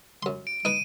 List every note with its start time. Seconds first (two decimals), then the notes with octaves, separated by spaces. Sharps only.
0.23 F#2 C6
0.47 D7
0.65 D#4 B4 D#7